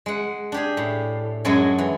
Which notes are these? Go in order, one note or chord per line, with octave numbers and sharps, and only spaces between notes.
G#3 F#5
D4 G4 G#4
A2
F#2 F#3 G#3 A4 G#5
E3